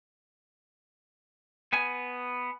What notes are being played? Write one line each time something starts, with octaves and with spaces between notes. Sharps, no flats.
B3 G#5